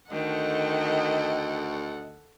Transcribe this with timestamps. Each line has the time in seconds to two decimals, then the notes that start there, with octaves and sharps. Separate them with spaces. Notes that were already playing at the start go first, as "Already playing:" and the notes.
0.12 D2 D#3 A4 D#5 F#5 G5